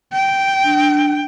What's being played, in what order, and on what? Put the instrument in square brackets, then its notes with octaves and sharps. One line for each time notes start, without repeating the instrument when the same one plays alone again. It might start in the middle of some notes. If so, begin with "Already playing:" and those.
[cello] G5
[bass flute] D4